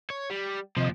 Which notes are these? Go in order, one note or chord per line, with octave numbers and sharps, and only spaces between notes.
C#5
G3
D#2 C3 F3 D#5